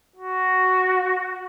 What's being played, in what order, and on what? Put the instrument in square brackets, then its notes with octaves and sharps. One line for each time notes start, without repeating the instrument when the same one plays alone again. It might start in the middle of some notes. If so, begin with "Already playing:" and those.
[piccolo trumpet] F#4